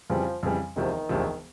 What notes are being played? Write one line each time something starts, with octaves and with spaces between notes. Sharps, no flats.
F2 C#3 E3 F3 G3
F2 C#3 E3 G3
E1 D2 C3 D#3 F3
E1 D2 C3 F3